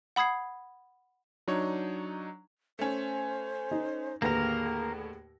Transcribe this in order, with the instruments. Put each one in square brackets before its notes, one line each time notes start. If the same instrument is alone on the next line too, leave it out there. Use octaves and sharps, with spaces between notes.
[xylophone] F#5 B5 D#6 G#6 C7
[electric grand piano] F#3 D4 D#4 C#5
[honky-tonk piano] A3 C#4 [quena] C5
[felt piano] D#4
[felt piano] D#2 B4 A#6 [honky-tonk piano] A2 D3 [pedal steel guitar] A#3 A#4 [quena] G#4